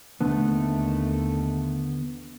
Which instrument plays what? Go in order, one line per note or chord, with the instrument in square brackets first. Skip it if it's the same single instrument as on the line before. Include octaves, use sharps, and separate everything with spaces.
[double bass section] D#2 A3 [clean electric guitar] D3 B3